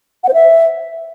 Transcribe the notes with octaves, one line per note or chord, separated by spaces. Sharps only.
F#5
C5
E5